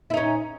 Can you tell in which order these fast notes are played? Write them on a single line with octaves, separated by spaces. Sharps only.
E4 D#4 C#4